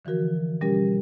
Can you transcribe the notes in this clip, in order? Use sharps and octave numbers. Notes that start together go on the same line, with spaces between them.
D3 E3 F3 F#4 A#4
B2 G3 C#4 G4 A#4